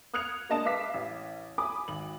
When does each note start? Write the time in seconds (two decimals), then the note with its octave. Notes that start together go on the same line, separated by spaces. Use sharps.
0.14 D#6 F6 F#6 G#6 C#7 F7
0.49 G#3 A#3 D4 D#5 A5 E7
0.65 B4 E5 F5 D6 B6
0.94 A1
1.58 G#5 B5 D6 D#6
1.88 G#1 F#7